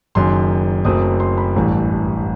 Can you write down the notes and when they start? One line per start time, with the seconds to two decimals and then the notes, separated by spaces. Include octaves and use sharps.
0.15 F#1 F#2 D#3 C6
0.85 F#1 F#2 F#3 A3 C4 D#6
1.20 C6
1.37 B5
1.56 A1 G2 E3 A3